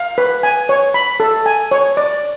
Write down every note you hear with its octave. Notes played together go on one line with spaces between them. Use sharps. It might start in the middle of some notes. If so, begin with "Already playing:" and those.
Already playing: F5
B4
G#5
C#5
B5
A4
G#5
C#5
D5